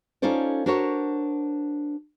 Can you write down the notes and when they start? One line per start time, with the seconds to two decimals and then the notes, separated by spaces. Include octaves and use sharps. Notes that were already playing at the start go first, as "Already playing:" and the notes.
0.22 C#4 D#4 F4 A4 C5 D5
0.66 D4 F#4 A#4 C5 C#5